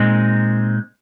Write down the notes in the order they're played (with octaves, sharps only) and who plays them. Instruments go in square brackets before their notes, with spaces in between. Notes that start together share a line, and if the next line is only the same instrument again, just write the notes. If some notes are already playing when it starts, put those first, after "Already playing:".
Already playing: [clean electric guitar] A#2 G#3 C4 D#4